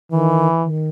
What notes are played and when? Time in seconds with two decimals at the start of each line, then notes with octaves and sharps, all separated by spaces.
0.12 D#3 E3
0.64 D#3